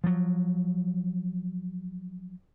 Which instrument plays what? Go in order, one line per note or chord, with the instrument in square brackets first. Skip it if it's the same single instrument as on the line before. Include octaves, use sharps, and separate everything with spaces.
[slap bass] F3 F#3